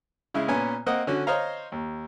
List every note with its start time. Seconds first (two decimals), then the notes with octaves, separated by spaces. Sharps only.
0.34 C#3 G#3 E4
0.48 A#2 B3 C#4 G#5
0.86 A#3 C4 D#5 F#5
1.07 D3 C#4 F#4
1.27 C5 C#5 D#5 F5 A#5
1.72 D#2